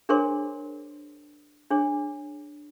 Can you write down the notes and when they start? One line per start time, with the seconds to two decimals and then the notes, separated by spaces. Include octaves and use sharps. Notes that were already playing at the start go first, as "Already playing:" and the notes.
0.09 D4 G#4 A#4 C5 C#5 C6
1.71 D4 G#4 C#5